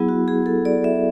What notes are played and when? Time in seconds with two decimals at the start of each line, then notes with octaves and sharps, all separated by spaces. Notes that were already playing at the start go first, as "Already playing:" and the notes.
Already playing: F#3 B3 E4 G#4
0.09 F#4
0.28 G#4
0.46 A4
0.65 D5
0.84 E5